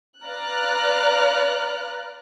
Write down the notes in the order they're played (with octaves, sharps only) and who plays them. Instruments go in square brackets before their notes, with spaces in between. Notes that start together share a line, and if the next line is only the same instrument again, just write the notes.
[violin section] B4 D5 F5 A#5 F6 F#6